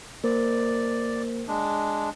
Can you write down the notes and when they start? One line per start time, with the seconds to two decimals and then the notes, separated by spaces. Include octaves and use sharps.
0.24 A#3 A#4 C5 D5
1.48 G#3 D4